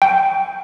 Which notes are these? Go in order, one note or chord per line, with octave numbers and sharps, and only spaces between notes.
G5